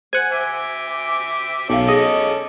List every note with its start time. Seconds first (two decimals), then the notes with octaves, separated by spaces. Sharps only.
0.13 C5 F#5 G#5
0.32 E5 G#5 D6
1.70 B1 C#4 A4 F5 G5 D6
1.89 G#4 D#5